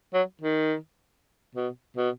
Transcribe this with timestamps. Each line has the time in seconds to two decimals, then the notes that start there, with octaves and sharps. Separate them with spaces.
0.14 F#3
0.41 D#3
1.55 B2
1.97 B2